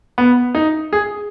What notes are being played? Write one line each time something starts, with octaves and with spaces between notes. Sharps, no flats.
B3
D#4
G#4